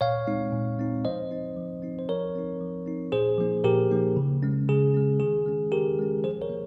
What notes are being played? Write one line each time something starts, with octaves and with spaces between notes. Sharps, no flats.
A#2 C#5 F5
G#3 C4 D#4
A#2
G#3 C4 D#4
F3 C5 D#5
C4 D#4
F3
C4 D#4
C5
F3 A#4 C#5
C4 D#4
F3
C4 D#4
A#2 G#4 C5
F3 A#3 D#4
A#2 G4 A#4
F3 A#3 D#4
C#3
G#3 C#4
C#3 G#4
G#3 C#4
D#3 G#4
G#3 C#4
D#3 G4 A#4
G#3 C#4
F3 G#4 C5
A#4 C#5
A#3